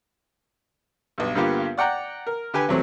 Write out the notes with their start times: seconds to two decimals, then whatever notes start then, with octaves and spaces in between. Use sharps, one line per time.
1.18 B1 G2
1.35 G2 D3 A#3 B3 F4 G4
1.78 D5 F#5 G5 A#5
2.27 A#4
2.54 D3 G4 B4 G#5
2.69 E2 C3 F#3 A3 C4